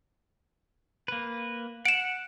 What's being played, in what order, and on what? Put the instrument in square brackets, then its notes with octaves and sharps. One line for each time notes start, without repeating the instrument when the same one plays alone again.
[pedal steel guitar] A#3 B4
[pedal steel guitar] F#5 [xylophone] D7 E7